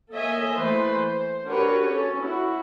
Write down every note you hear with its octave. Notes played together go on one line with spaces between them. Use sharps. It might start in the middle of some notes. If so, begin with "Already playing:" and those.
A#3 A4 C#5 D#5 E5 G#5
E3 A3 B4 C5 C6
C5
D4 F#4 G4 A#4 B4 C#5
C#4 A4 C#5
E4 F#4